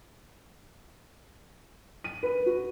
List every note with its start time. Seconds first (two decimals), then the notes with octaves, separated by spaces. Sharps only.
2.04 D#7
2.23 B4
2.46 F#4